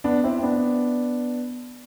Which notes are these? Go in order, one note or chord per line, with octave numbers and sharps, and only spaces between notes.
B3 D4
C4 E4
E4
B3 D4